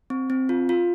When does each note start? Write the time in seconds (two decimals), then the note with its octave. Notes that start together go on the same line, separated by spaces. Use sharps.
0.10 C4
0.30 C4
0.49 F4
0.69 F4